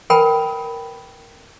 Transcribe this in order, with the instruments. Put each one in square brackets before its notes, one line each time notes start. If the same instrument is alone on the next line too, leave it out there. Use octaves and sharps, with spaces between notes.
[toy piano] A#4 B4 G5 G#5 B5